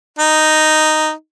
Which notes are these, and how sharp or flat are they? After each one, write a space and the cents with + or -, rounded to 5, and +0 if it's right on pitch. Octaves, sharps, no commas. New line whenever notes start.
D#4 -5